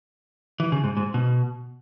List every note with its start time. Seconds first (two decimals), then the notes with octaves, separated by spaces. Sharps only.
0.60 E3
0.72 C#3
0.84 G#2
0.97 G#2
1.14 B2